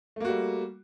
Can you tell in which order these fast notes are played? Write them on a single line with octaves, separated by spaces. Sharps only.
A3 A#3 F#4 G3